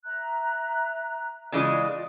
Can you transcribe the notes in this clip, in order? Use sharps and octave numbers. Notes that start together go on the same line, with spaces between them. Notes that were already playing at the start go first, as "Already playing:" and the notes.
E5 A#5 F#6
C#3 E3 G#3 F4 D5 D#5